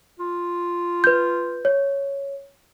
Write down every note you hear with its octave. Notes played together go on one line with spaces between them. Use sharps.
F4
B4 G6
C#5